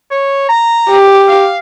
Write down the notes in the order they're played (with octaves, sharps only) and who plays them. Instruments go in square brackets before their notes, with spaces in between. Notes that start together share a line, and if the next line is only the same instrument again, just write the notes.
[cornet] C#5
A#5
[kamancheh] G4
[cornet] F5